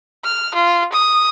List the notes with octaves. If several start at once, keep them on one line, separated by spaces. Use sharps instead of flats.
F6
F4
D#6